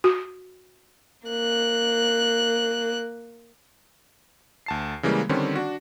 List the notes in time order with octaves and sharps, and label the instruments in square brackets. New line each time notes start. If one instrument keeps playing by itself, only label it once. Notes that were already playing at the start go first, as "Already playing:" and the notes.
[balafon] F#4
[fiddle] A#3 F#6
[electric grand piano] D2 A5 C7
C#3 E3 G3 G#3 A#3
D3 D#3 G3 C4 C#4
D4 F#4